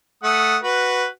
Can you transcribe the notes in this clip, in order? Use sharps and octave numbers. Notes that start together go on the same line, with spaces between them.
A3 F#5 D#6
F#4 B4